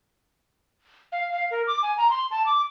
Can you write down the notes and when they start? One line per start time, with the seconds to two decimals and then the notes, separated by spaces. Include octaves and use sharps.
1.12 F5
1.32 F5
1.51 A#4
1.67 D6
1.83 G#5
1.98 A#5
2.10 C6
2.31 A5
2.46 D6